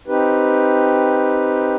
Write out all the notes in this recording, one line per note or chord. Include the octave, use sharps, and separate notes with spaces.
C4 D#4 G4 B4